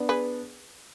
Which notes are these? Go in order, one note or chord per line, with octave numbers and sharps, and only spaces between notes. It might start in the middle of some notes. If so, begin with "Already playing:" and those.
Already playing: B3 D4
G#4 B4